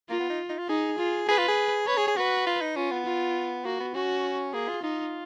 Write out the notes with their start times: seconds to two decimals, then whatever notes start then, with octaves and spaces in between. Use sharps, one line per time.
0.09 A#3 F4
0.20 B3
0.29 D#4
0.49 D#4
0.59 F4
0.69 D#4 G#4
0.98 F4
1.28 G#4 B4
1.38 F4
1.48 G#4
1.87 B4 C#5
1.97 G#4
2.07 G#4
2.17 F#4 B4
2.47 F4
2.61 D#4
2.76 C#4 F4
2.91 B3
3.05 F4
3.65 A#3 F#4
3.80 B3
3.94 C#4 F#4
4.53 A#3 G#4
4.68 F4
4.83 D#4 F4